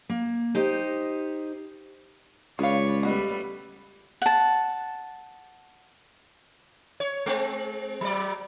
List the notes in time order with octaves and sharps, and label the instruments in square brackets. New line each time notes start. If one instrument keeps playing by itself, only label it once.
[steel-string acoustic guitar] A#3
D#4 G4 C5 D#5
[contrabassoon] C#2 [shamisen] G#4 F5 [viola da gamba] B4 C#5 D5
[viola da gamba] G3 A3 B4 [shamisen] B3 F#4 D#5
[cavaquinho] F#5 A5
[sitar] C#5
G#3 C4
F#3 D5